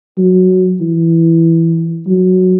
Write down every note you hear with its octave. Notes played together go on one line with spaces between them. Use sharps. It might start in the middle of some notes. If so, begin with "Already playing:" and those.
F#3
E3
F#3